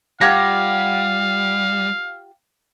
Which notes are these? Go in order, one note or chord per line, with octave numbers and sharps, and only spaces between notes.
G3 F4 G4 F5 F#5 G#6 A#6